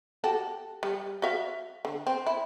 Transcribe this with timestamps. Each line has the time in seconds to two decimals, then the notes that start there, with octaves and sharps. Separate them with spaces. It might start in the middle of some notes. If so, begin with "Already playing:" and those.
0.24 F#4 G4 A4
0.83 G3
1.22 F#4 E5 F5
1.85 D3
2.07 C4
2.27 E4